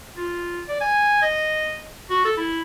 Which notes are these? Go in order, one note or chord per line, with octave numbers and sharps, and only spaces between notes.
F4
D5
G#5
D#5
F#4
A4
E4